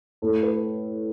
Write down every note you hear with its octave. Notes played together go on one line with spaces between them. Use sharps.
A2 A4
B4